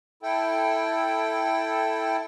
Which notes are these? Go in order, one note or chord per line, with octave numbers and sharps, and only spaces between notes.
E4 A4 G5